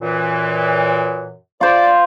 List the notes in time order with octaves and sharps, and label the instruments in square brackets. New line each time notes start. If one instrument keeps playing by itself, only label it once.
[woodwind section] F#2 A#2 E3
[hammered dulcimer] F4 C5 [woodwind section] D5